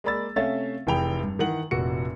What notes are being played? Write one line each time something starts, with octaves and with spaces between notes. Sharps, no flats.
G#3 A#3 D5 B5 E6 A6
C3 A3 C#4 E5 F5 A6
F1 E3 G#4 G5 B5 F7
G2
D#3 E3 F#5 F#7
F1 A#2 F#4 C#7